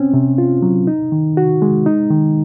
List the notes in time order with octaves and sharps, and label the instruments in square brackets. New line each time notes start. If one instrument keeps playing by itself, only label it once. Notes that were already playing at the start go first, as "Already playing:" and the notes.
Already playing: [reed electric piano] C4 C#4
C3
F4
F#3
D#4
D#3
F#4
G#3
D#4
D#3